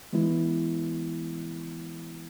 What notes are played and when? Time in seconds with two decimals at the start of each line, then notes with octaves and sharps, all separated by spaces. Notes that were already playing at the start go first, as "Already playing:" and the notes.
0.13 E3 G#3 B3 E4